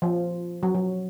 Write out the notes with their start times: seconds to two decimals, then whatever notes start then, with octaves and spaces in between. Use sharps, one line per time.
0.02 F3
0.63 F#3
0.75 F#3